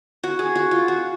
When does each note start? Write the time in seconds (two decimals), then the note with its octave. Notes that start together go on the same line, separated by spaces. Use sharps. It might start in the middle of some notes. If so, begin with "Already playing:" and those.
0.23 F#4
0.39 G#4
0.55 F#4
0.71 F4
0.88 F#4